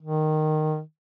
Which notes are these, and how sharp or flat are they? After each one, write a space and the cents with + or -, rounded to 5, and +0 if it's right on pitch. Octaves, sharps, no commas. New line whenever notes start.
D#3 -10